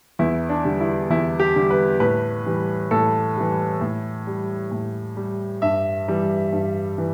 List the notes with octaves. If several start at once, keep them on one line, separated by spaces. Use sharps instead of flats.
E2 E4
D4
D3 G3
E4
E2 E4
G4
D3 G3
B4
A2 B4
E3 G3
A2 A4
E3 G3
A2
G3
A2
G3
G2 E5
E3 G3
G2
E3